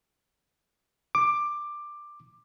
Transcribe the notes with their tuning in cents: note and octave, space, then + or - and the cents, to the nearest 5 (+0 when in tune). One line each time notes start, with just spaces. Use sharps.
D6 +15